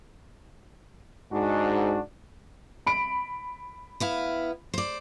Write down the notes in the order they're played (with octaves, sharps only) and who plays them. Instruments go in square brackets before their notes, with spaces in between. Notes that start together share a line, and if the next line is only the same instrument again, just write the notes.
[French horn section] G#2 [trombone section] D4 F#4
[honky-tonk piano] B5 D7
[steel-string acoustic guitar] B3 E4 F5
C5 D5